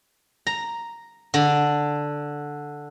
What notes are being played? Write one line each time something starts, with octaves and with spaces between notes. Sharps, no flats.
A#5
D3